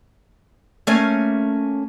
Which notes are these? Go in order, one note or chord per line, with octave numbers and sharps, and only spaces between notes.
A3 A#3 C#4